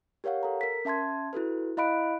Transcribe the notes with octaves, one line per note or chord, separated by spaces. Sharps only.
G4 A#4 C#5 F5 F#5
A4 A#5
A#4 B6
C#4 E5 A5 C6 G#6
E4 F#4 A4 B4
E4 D#5 F5 B5 F#6 D7